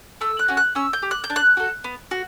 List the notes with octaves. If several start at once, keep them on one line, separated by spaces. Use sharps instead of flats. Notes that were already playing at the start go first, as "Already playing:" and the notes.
A3 E6
F#6
C#4 F#4
F#6
C#4 E6
G6
G4
F#6
G6
D4
F#6
F#4 A4
B3
F#4